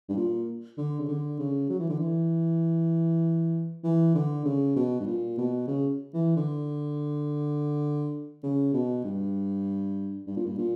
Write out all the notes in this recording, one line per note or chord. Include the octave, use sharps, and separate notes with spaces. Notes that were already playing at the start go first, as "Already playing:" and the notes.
G2
A#2
D3
C#3
D3
C#3
F#3
E3
D3
E3
E3
D3
C#3
B2
G2
A#2
B2
C#3
E3
D3
C#3
B2
G2
G2
A#2
G2
A#2